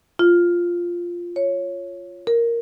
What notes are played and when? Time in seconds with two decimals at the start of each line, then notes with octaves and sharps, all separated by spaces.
0.19 F4
1.36 C#5
2.27 A#4